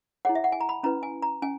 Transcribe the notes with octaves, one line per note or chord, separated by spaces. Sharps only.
E4 G#4 C#5 F#5
E5
F#5
G#5
A#5
B5
C#4 E4 B4 A#5
G#5
A#5
C#4 G#5